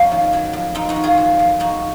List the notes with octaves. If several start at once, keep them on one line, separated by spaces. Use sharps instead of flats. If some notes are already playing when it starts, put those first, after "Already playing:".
Already playing: F2 A#3 C#4
D#3
F#3
F2
F2 C4 D#4
D#4 F#4
D#3
F4 G#4
F#3
F2
F2 D#4 F#4